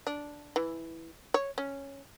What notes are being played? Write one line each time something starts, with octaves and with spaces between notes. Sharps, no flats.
D4
E3
C#5
C#4